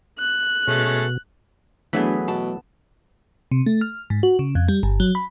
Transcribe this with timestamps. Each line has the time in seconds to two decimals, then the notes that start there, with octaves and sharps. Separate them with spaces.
0.18 F#6
0.67 B2 G#3 A3 C#4
1.93 D2 E3 F#3 A3 B3 G#4 B5
2.28 B2 A5
3.52 C3
3.66 A3
3.81 F6
4.10 G#2
4.23 F#4
4.39 C#3
4.55 F2
4.68 G3
4.83 G1
5.00 F#3
5.15 B5